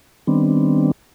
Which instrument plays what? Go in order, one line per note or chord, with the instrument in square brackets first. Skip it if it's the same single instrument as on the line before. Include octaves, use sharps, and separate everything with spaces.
[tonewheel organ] D#3 G3 B3 C4 D4